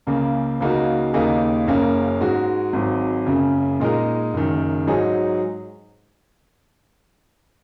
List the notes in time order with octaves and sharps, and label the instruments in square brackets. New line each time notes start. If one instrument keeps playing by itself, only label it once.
[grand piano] C#2 C#3 A#3
C#2 C#3 A#3 D#4 F#4
D#2 C#3 A#3 D#4 G#4
F#1 F#2 C#3 A#3 C#4
G#2 G#3 F#4
G#1 G#2 F#3
F#1 F#2 C#3
A#2 G#3 D#4 A#4
F#1 F#2 D#3
G#2 F#3 D#4 G#4